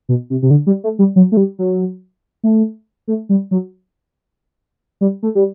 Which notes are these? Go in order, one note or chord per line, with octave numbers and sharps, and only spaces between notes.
B2
C3
C3
D3
G3
A3
G3
F#3
A3
G3
F#3
A3
A3
G3
F#3
G3
A3
G3